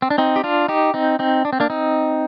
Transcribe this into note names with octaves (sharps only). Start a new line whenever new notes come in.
C4
D4
C4 D#4
G4
D4 F4
D#4 G4
C4 D#4
C4 D#4
D4
C4
A#3 D4
C4 D#4